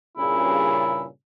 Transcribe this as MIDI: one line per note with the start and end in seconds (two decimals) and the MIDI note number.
0.18 1.06 43
0.18 1.06 46
0.18 1.06 49
0.18 1.04 64